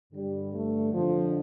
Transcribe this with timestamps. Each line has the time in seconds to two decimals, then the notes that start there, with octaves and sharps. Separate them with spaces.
0.13 G2 D3 G3
0.53 A3
0.92 F2 D3 F3